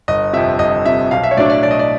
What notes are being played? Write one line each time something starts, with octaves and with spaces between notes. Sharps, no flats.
G1 D#5
F2 C3 E5
G1 D#5
F2 C3 E5
B1 F5
E5
C#5
A2 F#3 A3 D4 D5
D5
B1 D5
D#5
D5